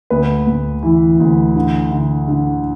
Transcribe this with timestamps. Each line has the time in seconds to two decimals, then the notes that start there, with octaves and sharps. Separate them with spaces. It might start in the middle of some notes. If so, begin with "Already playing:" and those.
0.10 D2 B4
0.47 D2
0.83 E3 E4
1.20 D2
1.55 D3
1.92 D3
2.28 D3